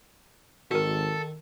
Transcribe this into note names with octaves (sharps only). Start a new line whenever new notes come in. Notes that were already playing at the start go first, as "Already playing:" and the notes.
G#1 D#3 F#4 A4 A#4